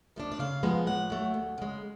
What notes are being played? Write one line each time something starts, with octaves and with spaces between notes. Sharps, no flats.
F3 A3 D4
D5
C#3 F5
F3 G#3 B3
A2 F#5
F#3 A3
D2
C#3 G#3